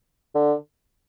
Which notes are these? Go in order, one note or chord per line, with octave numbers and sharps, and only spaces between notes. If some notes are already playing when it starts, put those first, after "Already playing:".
D3